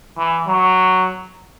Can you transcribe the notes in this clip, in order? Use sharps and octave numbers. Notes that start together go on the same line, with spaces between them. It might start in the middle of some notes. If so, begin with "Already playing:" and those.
E3
F#3